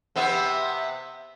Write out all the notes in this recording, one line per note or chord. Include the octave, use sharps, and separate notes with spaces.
C3 B3 E5